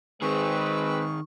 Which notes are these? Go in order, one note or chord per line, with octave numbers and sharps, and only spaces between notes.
D#3 G#3 C4 G#4 B4 C#6